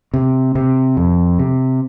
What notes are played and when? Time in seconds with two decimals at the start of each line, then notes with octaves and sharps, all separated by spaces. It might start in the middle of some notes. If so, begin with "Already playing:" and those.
0.14 C3
0.55 C3
0.97 F2
1.39 C3